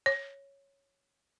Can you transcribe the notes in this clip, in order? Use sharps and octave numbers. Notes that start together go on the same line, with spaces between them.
C#5